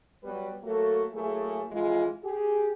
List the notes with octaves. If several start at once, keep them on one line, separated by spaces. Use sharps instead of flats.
F#3 G3 B3 B4
F#3 A3 A#3 F#4 A4
F#3 A3 A#3 E4 G#4
F2 G#2 E3 G#3 F4
G4 G#4